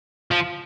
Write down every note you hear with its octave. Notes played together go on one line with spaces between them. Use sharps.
F3